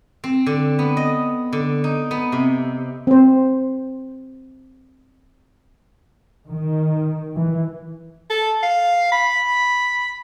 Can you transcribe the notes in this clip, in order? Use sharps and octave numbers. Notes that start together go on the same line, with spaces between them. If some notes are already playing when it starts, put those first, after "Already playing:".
C4
D3
B3
D#5
D3
D#4
B3
C3
C4 C5
D#3
E3
A4
F5
B5